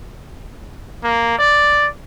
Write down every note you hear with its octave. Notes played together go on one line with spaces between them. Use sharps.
A#3
D5